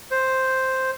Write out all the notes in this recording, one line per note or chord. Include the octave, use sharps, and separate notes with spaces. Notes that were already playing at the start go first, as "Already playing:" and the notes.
C5